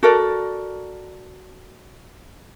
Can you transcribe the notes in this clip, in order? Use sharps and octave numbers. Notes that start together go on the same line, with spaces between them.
F#4 A4 A#4 D5